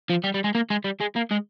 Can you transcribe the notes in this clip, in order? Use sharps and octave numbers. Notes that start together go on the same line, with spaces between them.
F3
G3
G3
G#3
A#3
G#3
G3
G#3
A#3
G#3